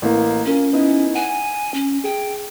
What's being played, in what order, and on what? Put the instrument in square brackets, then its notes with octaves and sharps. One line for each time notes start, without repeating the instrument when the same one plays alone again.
[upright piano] A1 A#3
[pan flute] C#4 [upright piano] F4 A#4
[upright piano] B3 D#4 E4
[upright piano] F#5 [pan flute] G#5
[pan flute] C#4
[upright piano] G#4 [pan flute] G5